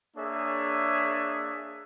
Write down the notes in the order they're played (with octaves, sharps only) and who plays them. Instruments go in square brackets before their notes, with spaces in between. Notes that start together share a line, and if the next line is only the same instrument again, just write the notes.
[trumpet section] A#3 D4 G#4 C#5 E5